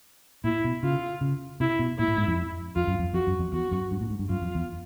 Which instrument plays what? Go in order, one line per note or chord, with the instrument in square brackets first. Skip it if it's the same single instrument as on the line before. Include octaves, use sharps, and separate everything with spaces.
[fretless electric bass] A#2 [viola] E4
[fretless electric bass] B2
[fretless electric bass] C#3 [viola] F4
[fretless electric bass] C#3
[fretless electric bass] C3 [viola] E4
[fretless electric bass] B2
[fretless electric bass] A#2 [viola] E4
[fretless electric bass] A2
G#2
F2
[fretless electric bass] F2 [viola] F4
[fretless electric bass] F#2
F2
[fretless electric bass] F2 [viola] F#4
[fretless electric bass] F#2
F2
[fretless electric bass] E2 [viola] F#4
[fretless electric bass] F#2
G2
A2
G#2
G2
[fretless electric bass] F#2 [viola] F4
[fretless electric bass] F2
E2